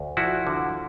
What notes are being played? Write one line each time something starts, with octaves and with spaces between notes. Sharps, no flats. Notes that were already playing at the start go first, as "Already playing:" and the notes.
Already playing: D2
F3 E4 F#4
D3